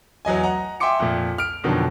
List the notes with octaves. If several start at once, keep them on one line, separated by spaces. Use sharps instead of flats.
E2 F#3 D#5 G#5
D#5 F#5 A#5
E5 G5 G#5 C6 D6 C#7
F2 A#2
F6 D7
F2 B2 D3 D#3 F#3